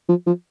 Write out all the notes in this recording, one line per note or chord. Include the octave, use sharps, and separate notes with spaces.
F3
F3